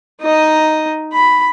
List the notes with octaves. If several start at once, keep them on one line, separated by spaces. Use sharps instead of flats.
D#4 D#5
B5